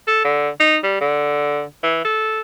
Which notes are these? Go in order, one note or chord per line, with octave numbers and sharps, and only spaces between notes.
A4
D3
D#4
G3
D3
E3
A4